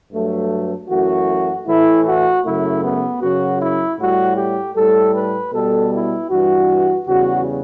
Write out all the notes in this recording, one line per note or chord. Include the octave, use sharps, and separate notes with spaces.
G2 F#3 A3
F#2 E3 A3 F#4
A2 E3 A3 E4
F#4
F#2 C#3 F#3 A3 E4
B3
F#2 C#3 F#3 F#4
E4
A2 G3 F#4
G4
A2 G3 A4
B4
B2 G3 A4
E4
G2 E3 G3 F#4
E2 C#3 G3 F#4